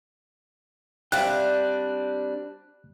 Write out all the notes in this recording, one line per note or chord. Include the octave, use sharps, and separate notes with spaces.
G3 C4 D4 E5 F5 G5 F#6